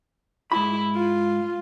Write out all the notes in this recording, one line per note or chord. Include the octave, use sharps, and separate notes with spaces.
G#2 E4 B5
F4